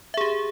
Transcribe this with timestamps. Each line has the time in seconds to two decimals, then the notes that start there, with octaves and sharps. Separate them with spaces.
0.14 E5
0.17 G#4
0.21 G4